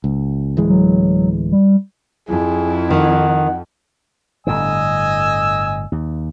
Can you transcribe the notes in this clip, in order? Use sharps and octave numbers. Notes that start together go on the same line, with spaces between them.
C#2
D1 E3 G#3
F#3
G3
F2 E4 G#4
D#3 F#5
G1 A2 D3 D#5 G#5 E6
D#2